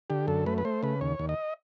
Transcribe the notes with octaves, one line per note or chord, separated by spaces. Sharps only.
D3 G4
F#2 A4
A3 B4
B4
A3 C5
C#3 B4
D#2 C#5
D#2
D#5